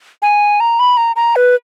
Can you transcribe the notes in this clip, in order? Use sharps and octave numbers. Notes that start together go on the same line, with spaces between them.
G#5
A#5
B5
A#5
A#5
B4